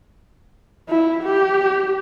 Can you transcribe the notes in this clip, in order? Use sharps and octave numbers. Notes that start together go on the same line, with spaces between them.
E4
G4